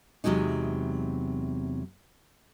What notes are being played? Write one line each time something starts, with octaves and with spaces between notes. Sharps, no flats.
E2 C3 F#3 G#3 D#4